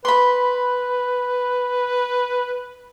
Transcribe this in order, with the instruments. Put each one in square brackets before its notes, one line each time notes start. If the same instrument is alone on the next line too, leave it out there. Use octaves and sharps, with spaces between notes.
[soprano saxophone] B4 [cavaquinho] B5 C6